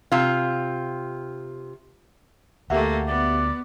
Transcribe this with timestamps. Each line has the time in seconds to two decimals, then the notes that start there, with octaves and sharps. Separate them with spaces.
0.12 C3 F4
2.70 D2 A3 A#3 G4 E5 F#5
3.07 B3 D5